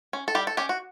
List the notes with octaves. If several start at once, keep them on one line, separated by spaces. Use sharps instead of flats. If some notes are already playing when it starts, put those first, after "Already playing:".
C#4
A4
G3 G4
A4
C#4 G4
F#4